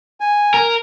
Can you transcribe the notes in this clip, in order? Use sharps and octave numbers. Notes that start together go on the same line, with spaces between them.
G#5
A#4